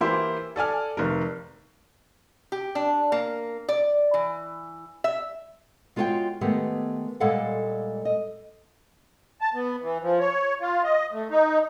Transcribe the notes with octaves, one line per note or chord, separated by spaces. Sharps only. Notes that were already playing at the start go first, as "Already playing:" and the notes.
E3 A#3 E4 G4 C5
A4 D5 G#5 F6
F1 D#3 A#4
G4
D4
A#3
D5
E3
E5
G#3 F4 F#4 A4 C#5 G5
D#3 G#3 A3 B3 G4
A#2 G3 G#3 A4 F5 F#5
D#5
A5
B3
E3
F3
C#5
F4
D#5
A3
D#4